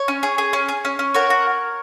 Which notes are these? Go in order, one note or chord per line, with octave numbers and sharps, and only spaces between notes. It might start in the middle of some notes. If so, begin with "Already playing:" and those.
Already playing: C#5
C#4
G#4
G#4
C#4
G#4
C#4
C#4
F#4 A#4 C#5
F#4